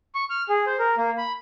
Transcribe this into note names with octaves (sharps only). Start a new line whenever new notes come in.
C#6
F6
G#4
C5
A#4
A#3
B5